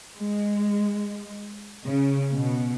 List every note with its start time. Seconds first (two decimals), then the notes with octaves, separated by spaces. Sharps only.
0.18 G#3
1.85 C#3
2.35 B2